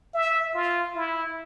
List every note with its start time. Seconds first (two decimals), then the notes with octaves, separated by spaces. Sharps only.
0.14 E5
0.54 F4
0.95 E4